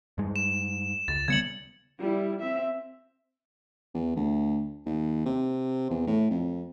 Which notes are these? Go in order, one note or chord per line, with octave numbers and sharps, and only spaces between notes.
G2 G#3
E7
C#2 A6
C#3 G3 B3 G#6 C#7 F#7
G3 E4
C4 E5
E2
D2
D#2
C3
E2
A2
F2